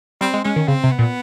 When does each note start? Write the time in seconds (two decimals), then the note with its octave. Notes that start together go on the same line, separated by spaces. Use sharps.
0.21 G3 C4
0.34 G#3
0.44 G#3 C#4
0.56 D#3
0.68 C#3 C4
0.83 C3
0.91 B3
0.98 A#2